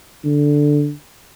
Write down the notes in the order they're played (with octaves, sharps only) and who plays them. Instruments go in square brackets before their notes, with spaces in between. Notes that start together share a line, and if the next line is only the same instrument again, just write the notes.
[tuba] D3